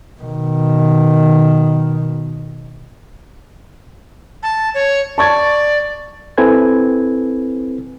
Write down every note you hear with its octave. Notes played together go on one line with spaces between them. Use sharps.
B2 D#3
A5
C#5
D5 A5 C#6 G#6
C4 E4 A4 B4 G#5 G#6